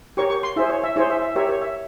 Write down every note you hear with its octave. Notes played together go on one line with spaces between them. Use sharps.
G4 A#4 C#5 C#6
C#6
C6
E4 G#4 C5 E5
C#5
E5
E4 G#4 C5 C#5
E5
E5
G4 A#4 C#5 E5
C#5
E5